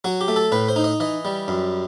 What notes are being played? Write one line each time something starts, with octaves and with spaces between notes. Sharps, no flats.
F#3 F#4
G4
A3
A4
A2 B4
C5
D#4
D#5
E3 D#5
G3
F#2